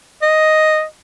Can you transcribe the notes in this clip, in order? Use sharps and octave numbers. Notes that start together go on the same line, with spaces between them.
D#5